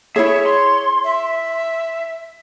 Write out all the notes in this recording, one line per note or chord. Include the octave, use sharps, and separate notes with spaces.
E4 G#4 C#5 E5
C6
E5